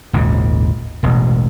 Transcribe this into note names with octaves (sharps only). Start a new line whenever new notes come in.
G#1 D#2 A#2 C#3
E1 A1 B2